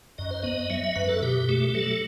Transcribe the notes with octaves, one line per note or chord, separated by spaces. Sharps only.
F#2 D#5
C5
B3 D#5
F#3 E5
E5
F#2 B4
A4
B2 G4
A3 G4
G4
F#3 A4